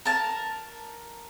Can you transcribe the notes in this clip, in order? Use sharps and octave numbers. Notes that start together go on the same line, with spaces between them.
A#4 A5